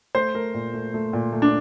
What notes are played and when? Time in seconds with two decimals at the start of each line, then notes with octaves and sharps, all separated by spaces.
0.15 A3 C5
0.35 A3 A#4
0.54 A#2
0.74 A3
0.94 A3
1.13 A#2
1.32 A3
1.42 D4